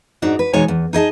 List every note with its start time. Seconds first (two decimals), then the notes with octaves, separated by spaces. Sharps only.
0.22 G#2 D4 D#4 F#4
0.39 B4
0.53 E2 B2 G#3 D#4 C#5 G#5
0.68 E2
0.93 D#4 G#4 D#5 A5